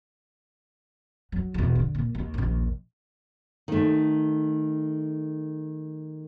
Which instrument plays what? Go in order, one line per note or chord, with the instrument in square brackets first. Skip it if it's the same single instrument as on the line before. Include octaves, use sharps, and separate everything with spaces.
[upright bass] F#3
E2 B2
D3
A#2
D#2
A#1 D#2
[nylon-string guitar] D#3 A3